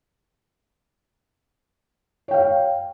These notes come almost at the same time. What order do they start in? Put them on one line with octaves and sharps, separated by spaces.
C#5 G5 F5